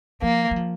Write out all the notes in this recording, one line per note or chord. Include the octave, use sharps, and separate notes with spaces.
F3 A#3
F#3
F3